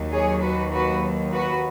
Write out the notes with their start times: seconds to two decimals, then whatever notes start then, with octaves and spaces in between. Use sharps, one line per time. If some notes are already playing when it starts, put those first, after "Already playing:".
Already playing: D#2 D#3 F#3
0.11 G#4 C#5
0.41 F#4 B4
0.71 F#4 B4
1.32 F#4 B4